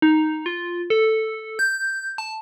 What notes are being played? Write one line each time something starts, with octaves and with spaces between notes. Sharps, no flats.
D#4
F4
A4
G6
A5